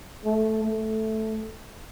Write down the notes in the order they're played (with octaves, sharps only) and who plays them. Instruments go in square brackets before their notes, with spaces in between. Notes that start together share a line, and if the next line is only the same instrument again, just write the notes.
[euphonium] A3
A3